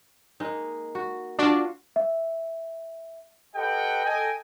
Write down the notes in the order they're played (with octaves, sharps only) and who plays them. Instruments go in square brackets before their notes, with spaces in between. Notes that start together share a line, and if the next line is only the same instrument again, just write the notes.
[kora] G#3 A#3 D#4
F#4
[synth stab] D4 [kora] F4 F#4
[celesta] E5
[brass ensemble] G4 A4 B4 D#5 F#5 G5
A4 D#5 G5 G#5